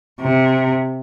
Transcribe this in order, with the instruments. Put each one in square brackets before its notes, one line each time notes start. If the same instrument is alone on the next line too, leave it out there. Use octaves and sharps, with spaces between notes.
[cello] C3